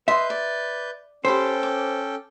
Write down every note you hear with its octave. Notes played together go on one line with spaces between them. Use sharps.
B4 D#5 E5 C6 G6
D5
C#4 G4 A4 C5 G5 B5
D6